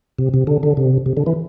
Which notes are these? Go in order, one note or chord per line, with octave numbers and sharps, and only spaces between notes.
C3
C3
D3
D3
C3
C3
D3
E3